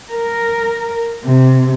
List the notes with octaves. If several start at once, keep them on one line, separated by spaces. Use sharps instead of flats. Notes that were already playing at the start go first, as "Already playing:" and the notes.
A#4
C3